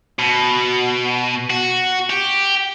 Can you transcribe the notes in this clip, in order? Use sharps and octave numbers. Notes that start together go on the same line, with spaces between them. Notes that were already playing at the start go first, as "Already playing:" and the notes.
B2
F#4
G4